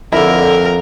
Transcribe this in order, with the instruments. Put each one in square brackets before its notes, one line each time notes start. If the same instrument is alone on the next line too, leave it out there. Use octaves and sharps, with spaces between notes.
[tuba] F2 [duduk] D3 [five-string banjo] E4 [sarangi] A#4